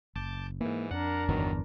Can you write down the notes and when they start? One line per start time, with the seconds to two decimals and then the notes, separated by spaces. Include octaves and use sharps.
0.16 F#1 A5 D6 G6
0.61 G#2 E3 A#3
0.91 F2 D4 A#4 F#5
1.29 G1 E2 D#3 F#3